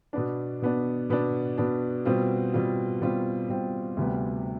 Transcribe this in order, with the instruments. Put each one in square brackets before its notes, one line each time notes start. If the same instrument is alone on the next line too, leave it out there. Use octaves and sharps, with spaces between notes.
[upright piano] B2 B3 D4
B2 B3 D4
B2 B3 D4
B2 B3 D4
B2 G3 C4 F4
B2 G3 C4 F4
B2 G3 C4 F4
B2 G3 C4 F4
D2 C3 G3 B3